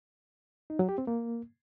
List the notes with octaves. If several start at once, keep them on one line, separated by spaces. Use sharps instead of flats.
D#4
F#3
G4
C4
A#3